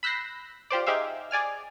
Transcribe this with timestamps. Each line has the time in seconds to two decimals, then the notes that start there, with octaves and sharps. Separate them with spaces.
0.03 B5 E6 F#6 G6 A#6 C7
0.70 F4 G4 C5 D5
0.86 D#4 G4 G#4 C5 E5 F5
1.31 G#4 D5 G#5 F6